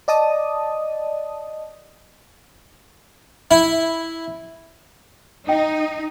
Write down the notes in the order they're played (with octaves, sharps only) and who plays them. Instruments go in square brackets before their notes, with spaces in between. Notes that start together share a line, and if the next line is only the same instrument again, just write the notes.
[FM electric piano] D5 D#5 A5 D#6
[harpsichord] E4
[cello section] D#4 [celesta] D#5 G5